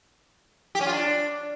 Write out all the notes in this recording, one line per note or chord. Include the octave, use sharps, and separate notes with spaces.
G4
C#4
F4
D4